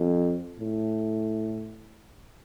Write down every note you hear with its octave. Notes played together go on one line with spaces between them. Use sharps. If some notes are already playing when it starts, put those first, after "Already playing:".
Already playing: F2
A2